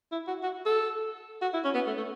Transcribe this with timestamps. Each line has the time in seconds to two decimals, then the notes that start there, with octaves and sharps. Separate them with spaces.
0.12 E4
0.28 F#4
0.43 F#4
0.66 A4
1.42 F#4
1.54 E4
1.64 C#4
1.75 B3
1.87 A3
1.97 A3